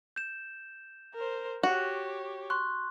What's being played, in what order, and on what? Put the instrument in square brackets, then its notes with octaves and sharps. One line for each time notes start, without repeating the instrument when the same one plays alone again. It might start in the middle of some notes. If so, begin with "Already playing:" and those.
[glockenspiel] G6 E7
[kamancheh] A#4 C5
[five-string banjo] F#4 [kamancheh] G4 C#5
[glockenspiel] C6 C#6 F#6